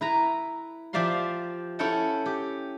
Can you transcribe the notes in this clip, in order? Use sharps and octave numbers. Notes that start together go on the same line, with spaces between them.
E4 B4 A#5
F3 G4 D5 E5 F5 C6
C#4 E4 A4 F#5 G5 A5
G4